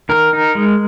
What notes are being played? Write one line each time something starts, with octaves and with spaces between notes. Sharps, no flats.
D#3 A#4
D#4
G#3